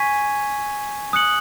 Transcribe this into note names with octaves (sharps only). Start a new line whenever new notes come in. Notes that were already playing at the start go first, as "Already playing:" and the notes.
Already playing: G#5 C#6 G#6 B6 D#7
D#6 F#6 C#7 F#7